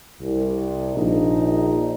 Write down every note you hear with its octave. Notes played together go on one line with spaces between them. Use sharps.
C2
A#1 D#4